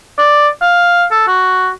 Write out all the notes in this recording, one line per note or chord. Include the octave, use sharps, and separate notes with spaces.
D5
F5
A4
F#4